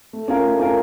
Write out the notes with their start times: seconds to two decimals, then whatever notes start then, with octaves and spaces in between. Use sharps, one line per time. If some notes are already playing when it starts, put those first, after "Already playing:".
0.13 A3
0.28 C#4 F4 A#4
0.44 A3
0.59 C#4 F4 A#4